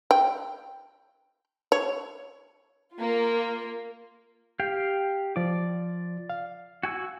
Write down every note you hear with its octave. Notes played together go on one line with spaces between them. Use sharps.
G5
C#5
A#3 F4
G4 F5 G5
F3 F4 D5 D6
F5
F#4 G#5 E6